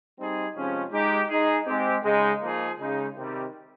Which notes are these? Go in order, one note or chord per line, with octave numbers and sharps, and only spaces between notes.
G3 C4 D#4 G#4
C3 F3 G#3 C#4
G#3 D#4 G4
G#3 D#4 G#4
G#3 C4 G4
C#3 G#3 D#4
F3 A#3 D#4 G#4
C#3 G#3 D#4
C3 D#3 G3